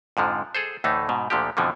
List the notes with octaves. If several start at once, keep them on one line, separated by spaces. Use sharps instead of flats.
F2 G#2 D3 F3
G#4 A4 C5
D2 A2 E3 A3 D#4
G#2 B2
D2 A#2 D3 F3 G4
F2 B2 D3 E3 F3